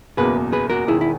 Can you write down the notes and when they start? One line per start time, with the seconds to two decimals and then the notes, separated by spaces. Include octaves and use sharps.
0.17 F#1 E2 B2 A#3 G#4 B4
0.53 G#4 B4
0.70 F#4 A#4
0.88 E1 E2 D#3 E4 G#4
1.01 E4